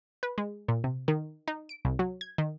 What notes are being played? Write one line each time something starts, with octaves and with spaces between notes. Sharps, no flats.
B4
G#3
A#2
C3
D#3
D#4
D7
C2
F#3
G#6
D#3